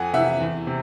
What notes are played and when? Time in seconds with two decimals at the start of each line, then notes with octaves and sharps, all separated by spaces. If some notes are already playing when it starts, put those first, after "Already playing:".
Already playing: F2 F#5 G#5
0.13 C3 E3 E5 F#5
0.40 E2
0.67 C3